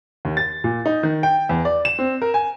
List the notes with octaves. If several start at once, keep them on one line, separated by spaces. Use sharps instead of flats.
D#2
A6
A#2
D#4
D#3
G5
E2
D5
E7
C4
A#4
G#5